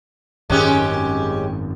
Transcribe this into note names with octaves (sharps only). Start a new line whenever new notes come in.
G#1 F#2 G#3 C#4 G4